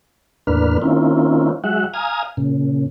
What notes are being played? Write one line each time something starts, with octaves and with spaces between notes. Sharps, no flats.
E2 A2 A#3 D4 B4 F6
D#3 A#3 C4 C#4 E4 F4
F#3 G#3 F#4 E5 F#5
F5 G#5 A#5 D#6 F6
A#2 C#3